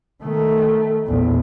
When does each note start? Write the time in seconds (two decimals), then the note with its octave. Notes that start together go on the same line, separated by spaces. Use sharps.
0.23 D#3 A3
1.07 A#1 E2